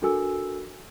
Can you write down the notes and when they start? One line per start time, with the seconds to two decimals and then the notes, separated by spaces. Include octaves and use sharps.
0.02 D4 F#4 A4 A#4 G#5 E6